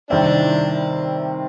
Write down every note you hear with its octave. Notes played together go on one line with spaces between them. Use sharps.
C3 D#3 G3 C4 D4 E4